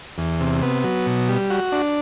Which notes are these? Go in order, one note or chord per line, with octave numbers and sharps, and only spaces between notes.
E2
C3
B3
F#3
B2
G3
F#4
D4